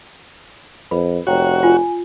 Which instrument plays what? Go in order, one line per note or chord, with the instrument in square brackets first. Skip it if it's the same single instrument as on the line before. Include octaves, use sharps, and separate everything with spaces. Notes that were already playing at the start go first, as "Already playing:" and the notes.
[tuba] F2 [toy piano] B4 B5
[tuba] F1 [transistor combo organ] F#4 [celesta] C#5 G5 A#5
[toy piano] F4 [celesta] G#5